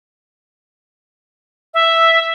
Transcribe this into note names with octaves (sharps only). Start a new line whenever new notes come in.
E5